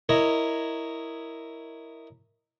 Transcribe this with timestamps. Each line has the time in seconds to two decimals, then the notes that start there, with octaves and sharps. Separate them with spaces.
0.09 E4 A#4 C#5 D#5